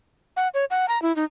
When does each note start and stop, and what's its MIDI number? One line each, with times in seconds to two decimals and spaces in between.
0.37 0.48 78
0.54 0.65 73
0.71 0.86 78
0.88 1.01 82
1.02 1.14 64
1.16 1.24 63